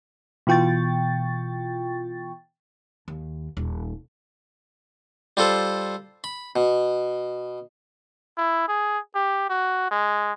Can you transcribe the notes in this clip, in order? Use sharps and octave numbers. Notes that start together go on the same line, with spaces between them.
B2 E3 F4 G5 C#6 A6
D#2
D#1
G3 F4 A4 C5
B5
B2
E4
G#4
G4
F#4
G#3